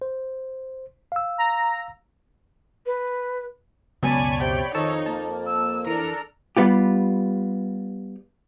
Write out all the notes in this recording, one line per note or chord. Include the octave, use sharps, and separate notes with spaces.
C5
F5 E6
A#5
B4
C#2 F#2 B2 C#5 D5 G#5 A5 B5
C3 G5
F2 D#3 D#4 C#5 A5 C#6 E6
A#3 A5
E6
E3 D4 A4 A#4 A#5
G3 B3 F4 G4